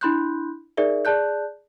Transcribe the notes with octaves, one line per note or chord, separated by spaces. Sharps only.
D4 E4 B5 C6 F#6 G6
D#4 G#4 A#4 D5 E5
G#4 D5 A5 F#6 G6